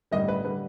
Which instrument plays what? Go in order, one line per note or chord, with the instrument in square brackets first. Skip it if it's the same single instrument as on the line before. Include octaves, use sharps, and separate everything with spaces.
[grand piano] A1 G2 D3 G3 D#5
B4
D3 G3 B4